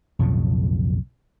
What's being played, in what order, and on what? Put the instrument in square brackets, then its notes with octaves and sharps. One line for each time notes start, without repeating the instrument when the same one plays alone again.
[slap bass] B1 F2 A2 C#3